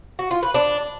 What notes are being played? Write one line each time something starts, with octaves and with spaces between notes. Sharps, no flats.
F#4
F4
B4
D4